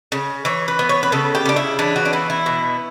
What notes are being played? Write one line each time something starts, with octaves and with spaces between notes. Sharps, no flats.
C#3
E3 C#5
B4
B3
C#5
B4
C#3 A4
G4
C#3 D4
E4
E3 D4
F#4
D4
B3 E4
E4
B2